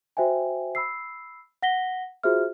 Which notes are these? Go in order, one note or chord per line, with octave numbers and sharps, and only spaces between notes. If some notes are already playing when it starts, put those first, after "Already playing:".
F#4 C5 E5 G5 G#5
B5 E6 C7
F#5 A#6 B6 G7
F4 F#4 G#4 C5 E5 F6